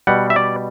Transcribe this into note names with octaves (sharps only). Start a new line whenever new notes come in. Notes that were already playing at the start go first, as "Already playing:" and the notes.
B2 G3 F#5
E5
D5